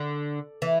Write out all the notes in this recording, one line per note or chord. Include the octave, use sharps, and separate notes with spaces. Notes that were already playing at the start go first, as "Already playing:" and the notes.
Already playing: D3
E3